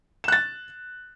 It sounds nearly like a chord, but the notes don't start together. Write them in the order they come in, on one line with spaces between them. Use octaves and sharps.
E7 F#6 A6